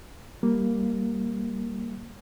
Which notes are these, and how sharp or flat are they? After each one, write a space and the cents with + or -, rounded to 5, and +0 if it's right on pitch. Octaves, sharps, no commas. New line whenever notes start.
G3 +0 A#3 +0